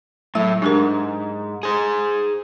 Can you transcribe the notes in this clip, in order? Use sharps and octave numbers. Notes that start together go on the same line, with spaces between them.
A2 F#3 A3 E5
G#2 D4 G4 A#4
G#4 C5